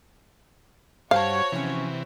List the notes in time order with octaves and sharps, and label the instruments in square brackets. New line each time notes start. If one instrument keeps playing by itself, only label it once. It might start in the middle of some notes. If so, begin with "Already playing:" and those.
[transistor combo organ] G2 [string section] F#4 C#5 [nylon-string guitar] C5 G5 A5 [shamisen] F5
[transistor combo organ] C3 E3 [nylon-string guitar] F3 C#4